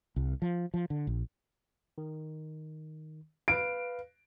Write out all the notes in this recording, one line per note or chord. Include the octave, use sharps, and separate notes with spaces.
C2
F3
F3
D3
A#1
D#3
B4 F5 D7